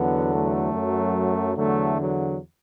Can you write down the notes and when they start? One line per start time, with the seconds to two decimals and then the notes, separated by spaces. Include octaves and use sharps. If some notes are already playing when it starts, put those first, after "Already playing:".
Already playing: E2 D3 F#3 B3
0.31 A3
0.73 F#2 F#3
1.56 E2 D3 F#3 A3
1.97 F#3